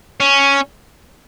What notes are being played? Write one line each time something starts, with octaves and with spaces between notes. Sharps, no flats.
C#4